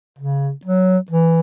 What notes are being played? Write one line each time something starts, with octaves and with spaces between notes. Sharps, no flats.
C#3
F#3
E3